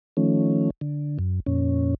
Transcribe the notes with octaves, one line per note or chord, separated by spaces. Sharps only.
D#3 F3 A3 C#4
D3
F#2
F2 A#2 C#4